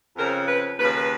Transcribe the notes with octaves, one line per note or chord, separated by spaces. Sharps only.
F2 C#3 F3 A#4
B4
D#2 C#3 F3 B4
B4